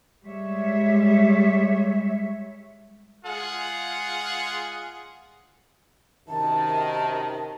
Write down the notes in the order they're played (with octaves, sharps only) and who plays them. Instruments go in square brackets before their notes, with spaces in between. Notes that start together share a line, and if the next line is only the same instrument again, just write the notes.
[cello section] G3 G#3 C#5 E5
[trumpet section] G#3 F4 G#4 F#5
[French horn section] F#2 C3 D#3 [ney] A5